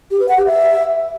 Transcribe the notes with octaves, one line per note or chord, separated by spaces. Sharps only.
G4
B4
F#5
G4
E5